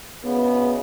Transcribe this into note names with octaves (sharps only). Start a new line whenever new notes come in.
D2 C#3 G#3 B3